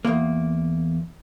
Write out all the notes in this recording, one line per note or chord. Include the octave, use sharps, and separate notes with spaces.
E2 A#3